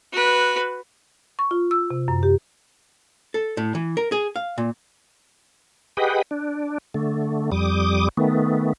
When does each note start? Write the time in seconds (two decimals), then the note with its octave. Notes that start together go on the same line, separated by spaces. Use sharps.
0.13 F#4 B4
1.39 C#6
1.51 F4
1.71 E6
1.90 C3
2.08 F#2
2.23 G4
3.34 A4
3.57 A2
3.75 E3
3.97 A#4
4.12 G#4
4.36 F5
4.58 A#2
5.97 G4 G#4 B4 D#5 F#5 G5
6.31 D4
6.94 D3 A3
7.52 F2 G3 D6 D#6
8.17 D#3 A3 B3